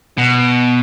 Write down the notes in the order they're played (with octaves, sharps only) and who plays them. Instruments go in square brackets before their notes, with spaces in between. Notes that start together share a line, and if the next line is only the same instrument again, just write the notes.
[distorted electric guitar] B2